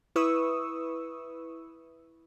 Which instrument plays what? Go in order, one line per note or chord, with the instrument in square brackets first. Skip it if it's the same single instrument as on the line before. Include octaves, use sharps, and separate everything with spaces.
[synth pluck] E4 B4 C#6 D#6 E6